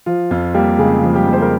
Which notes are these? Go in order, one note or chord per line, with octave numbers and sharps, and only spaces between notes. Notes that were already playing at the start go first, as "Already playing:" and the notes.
F3 F4
F2 F4
G3 A#3 G4
C#3 G#3 G#4
F3
G3 G4
F2
C5
A#4